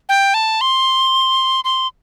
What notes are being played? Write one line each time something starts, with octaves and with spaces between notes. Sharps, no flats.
G5
A5
C6
C6